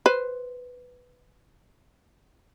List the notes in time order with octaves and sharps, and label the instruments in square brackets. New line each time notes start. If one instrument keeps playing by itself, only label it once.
[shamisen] B4 C5